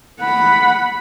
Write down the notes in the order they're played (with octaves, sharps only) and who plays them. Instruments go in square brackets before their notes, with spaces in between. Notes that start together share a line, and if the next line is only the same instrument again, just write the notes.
[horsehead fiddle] F#5 B5